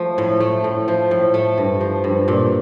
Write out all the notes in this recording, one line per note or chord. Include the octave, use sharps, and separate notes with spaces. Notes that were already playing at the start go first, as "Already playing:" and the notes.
Already playing: F3 A3
A2
A3
A2
F3
A2
A3
G2
F3
G2
A#2